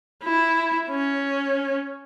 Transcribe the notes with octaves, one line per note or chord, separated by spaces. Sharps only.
E4
C#4